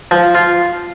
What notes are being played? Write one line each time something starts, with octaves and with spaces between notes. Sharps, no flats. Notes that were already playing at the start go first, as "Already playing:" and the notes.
F3
F4